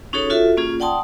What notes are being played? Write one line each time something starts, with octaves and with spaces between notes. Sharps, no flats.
C#4 D#4 F#4 G#4 A4 C#5
F4 F#4 A4 E5
A#3 C#4 F4 G#4
D5 F#5 G5 A5 C6 D#6